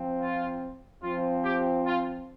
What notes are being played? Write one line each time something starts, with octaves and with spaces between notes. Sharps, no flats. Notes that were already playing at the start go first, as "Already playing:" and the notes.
Already playing: F3 C4
F4
F3 C4 F4
G4
F4